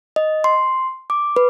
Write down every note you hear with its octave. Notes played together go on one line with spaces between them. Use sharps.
D#5
C6
D6
B4